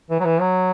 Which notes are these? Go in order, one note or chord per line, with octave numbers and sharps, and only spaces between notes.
E3
F#3
E3
F#3